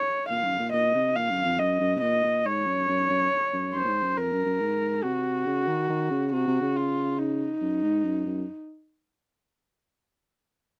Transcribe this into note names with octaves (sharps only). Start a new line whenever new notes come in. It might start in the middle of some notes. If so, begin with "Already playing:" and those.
Already playing: C#5
A#2 F5
F#2
A#2
A#2 D#5
C3
A#2 F5
F#2
F2
F#2 D#5
F#2
C3
A#2 D#5
A#2
G#2 C#5
F#2
F#2
F#2
F#2
F#2 C5
A#2
G#2
F#2
F2 A#4
F#2
F#2
G#2
C3 F#4
C#3
D#3
D#3
C#3
C3 F#4
C3
C#3
F4
D#4
F#2
G#2
F#2
F#2